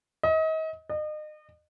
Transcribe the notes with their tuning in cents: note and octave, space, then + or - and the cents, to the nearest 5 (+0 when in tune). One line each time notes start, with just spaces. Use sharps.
D#5 +35
D#5 -35